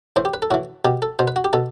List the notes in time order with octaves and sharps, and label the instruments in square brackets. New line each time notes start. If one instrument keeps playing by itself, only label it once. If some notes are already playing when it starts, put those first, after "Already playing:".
[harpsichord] A2 E3 C5
G4
B4
A4
A2 E3 F#4
B2 G4
A4
B2 C5
B4
F#4
G4
B2 A4